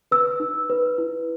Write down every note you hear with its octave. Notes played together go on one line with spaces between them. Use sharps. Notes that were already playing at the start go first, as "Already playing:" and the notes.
B4 E6
D#4
B4
E4